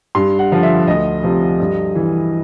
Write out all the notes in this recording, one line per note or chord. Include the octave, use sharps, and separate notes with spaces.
G2 C6
F#5
D3 F3
E5
D2 D#5
C3 F3
G2
E3